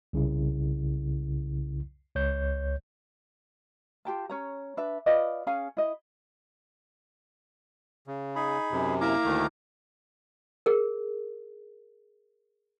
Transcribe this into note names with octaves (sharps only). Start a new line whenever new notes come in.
C2 C#3 E4
C#2 C#5 G6
F4 G4 G5 A5
C#4 C#5 A#5
D4 B4 E5
F4 B4 D5 D#5
C#4 G#4 F5 G#5
E4 D#5
C#3
D#4 G#4 B5
F#2 C3
A#3 E4 F5 A#5 D6
D2 D#3 A3
G#4 A#4